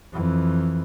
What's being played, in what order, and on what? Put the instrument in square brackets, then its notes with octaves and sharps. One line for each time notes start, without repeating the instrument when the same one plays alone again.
[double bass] F2 E3